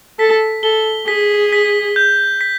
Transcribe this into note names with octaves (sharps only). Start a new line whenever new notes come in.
A4 B6
A4 G7
G#4 B6
B6
G6
B6